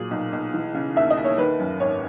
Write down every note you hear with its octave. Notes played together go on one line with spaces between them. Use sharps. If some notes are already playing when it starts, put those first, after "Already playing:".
Already playing: A#2 F#3 G#4
B1
B1
E3
C#3
D#2 E5
D#5
D#2
C#5
D#3 B4
F#2
G#1 C#5